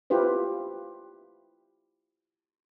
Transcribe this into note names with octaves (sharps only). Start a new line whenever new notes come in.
E4 F4 G4 B4 C5